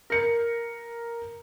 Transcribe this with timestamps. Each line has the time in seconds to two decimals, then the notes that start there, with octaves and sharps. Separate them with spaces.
0.10 A#4 C#7